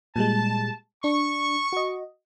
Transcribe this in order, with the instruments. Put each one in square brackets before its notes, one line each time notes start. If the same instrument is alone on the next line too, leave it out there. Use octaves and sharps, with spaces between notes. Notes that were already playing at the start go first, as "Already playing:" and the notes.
[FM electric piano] A#2 G3 G#3 [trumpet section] A5
[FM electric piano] D4 [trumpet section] C#6
[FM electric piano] F#4 D#5